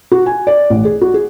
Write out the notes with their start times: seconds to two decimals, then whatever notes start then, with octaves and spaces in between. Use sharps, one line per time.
0.12 F#4
0.26 G#5
0.47 D5
0.70 A1
0.85 G#4
1.01 F#4
1.14 G#4